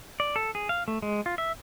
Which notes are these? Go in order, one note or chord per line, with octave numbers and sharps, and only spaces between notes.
D5
A4
G#4
F5
A3
G#3
F4
E5